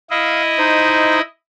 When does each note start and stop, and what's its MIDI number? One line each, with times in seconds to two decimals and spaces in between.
0.11 1.21 64
0.11 1.21 75
0.11 0.42 77
0.58 1.19 63
0.58 1.19 72